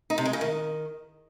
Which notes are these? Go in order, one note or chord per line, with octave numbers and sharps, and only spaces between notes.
D#4
C3
G#3
C#3
D#3